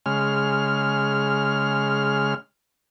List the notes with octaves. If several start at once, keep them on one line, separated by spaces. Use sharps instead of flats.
C#3 G#3 F6